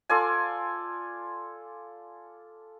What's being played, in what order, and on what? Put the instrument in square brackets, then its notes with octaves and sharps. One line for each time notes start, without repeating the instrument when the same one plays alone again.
[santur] F4 A4 D5 G#5